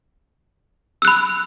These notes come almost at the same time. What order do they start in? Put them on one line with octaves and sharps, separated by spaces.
E6 F#6 B5